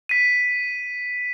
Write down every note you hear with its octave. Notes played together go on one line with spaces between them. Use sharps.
B6 D#7